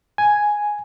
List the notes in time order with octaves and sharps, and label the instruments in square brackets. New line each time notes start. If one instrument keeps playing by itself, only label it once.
[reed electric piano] G#5